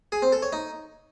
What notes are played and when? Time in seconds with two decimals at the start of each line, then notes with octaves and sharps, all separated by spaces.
0.12 G#4
0.22 C4
0.32 A4
0.43 C#5
0.53 D#4